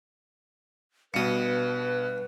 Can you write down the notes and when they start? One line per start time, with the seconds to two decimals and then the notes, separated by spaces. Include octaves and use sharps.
1.14 G2 B2 B4 D#6 C#7